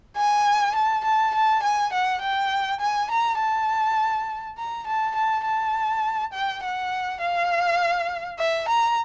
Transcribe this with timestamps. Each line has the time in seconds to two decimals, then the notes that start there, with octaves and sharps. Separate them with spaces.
0.17 G#5
0.76 A5
1.04 A5
1.34 A5
1.63 G#5
1.93 F#5
2.22 G5
2.81 G#5
3.11 A#5
3.39 A5
4.58 A#5
4.87 A5
5.16 A5
5.45 A5
6.33 G5
6.63 F#5
7.21 F5
8.39 E5
8.68 A#5